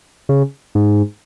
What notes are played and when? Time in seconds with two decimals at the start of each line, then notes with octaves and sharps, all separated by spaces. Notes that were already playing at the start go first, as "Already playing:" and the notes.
0.29 C#3
0.75 G#2